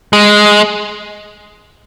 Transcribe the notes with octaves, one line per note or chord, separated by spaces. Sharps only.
G#3